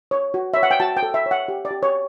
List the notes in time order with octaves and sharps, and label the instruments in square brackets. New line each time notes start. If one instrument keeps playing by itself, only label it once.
[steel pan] C#5
F#4
C#5 E5
F#5
G5
F#4 A5
G5
A4
E5
C#5
F#5
G4
D5
G4
C#5